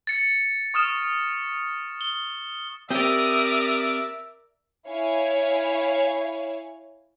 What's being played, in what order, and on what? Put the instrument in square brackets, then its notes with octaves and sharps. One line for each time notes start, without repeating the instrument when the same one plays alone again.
[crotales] A6 C#7
C#6 D#6 F6 E7
G7
[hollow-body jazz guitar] C4 G4 [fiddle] A#4 D5 [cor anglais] E5 [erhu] D#6
[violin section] E4 C#5 F5 G#5